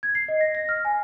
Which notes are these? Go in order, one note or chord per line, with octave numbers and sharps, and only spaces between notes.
G#6
C7
D#5
A#6
A#6
F6
G#5